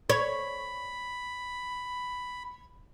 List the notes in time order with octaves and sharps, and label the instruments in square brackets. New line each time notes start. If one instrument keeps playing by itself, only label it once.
[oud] C#5 [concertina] B5